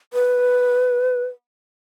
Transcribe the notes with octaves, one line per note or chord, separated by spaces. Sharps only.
B4